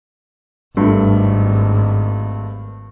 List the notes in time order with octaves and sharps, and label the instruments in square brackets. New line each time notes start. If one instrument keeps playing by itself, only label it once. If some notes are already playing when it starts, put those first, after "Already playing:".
[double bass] G#1 [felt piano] G2 A3